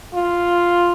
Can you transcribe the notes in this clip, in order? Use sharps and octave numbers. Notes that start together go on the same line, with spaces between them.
F4